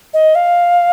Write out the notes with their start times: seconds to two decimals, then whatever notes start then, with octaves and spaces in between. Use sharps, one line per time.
0.14 D#5
0.35 F5